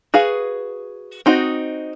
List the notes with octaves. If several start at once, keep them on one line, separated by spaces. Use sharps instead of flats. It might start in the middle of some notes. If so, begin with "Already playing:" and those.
F#4 G#4 B4 F5
C4 D#4 F#4 D#5